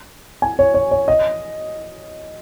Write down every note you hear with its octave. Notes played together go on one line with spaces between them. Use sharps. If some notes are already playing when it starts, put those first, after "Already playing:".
G#5
C#5
C#5
C#5
D#5